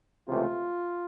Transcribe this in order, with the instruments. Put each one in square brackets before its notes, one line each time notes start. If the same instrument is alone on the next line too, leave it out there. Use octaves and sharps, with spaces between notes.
[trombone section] C#2 C3 E3 A3 F4